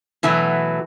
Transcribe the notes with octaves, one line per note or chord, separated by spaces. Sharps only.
B2 E3 F#3 A3